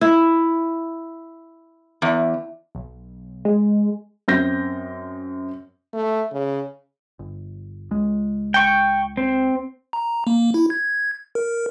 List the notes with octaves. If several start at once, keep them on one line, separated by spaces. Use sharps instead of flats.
E4
E2
B1
G#3
F#2 C4 G6 A#6
A3
C#3
G1
C#2 G#3
G5 C#6
C4
A#5
A#3
E4
G#6
A#4